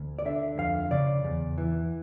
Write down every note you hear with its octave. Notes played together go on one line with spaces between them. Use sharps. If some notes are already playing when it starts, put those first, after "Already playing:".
Already playing: D2
D5
D3 E5
F2 F5
C#3 D5
E2
E3